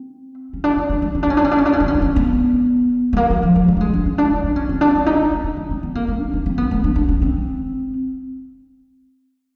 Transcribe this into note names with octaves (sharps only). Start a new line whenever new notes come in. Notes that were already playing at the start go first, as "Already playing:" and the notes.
Already playing: C4
C#4
D4
C#4
D4
D4
C#4
D4
C#4
D4
C#4
D4
C#4
D4
C#4
D4
C#4
D4
C#4
B3
A3
A#3
F#3
F3
F#3
G3
A3
G#3
D4
C#4
D4
D#4
D4
C#4
C4
D4
C#4
D#4
D4
D#4
D#4
C#4
C4
B3
A#3
A3
D#4
D4
C4
B3
A3
D4
D4
C#4
C4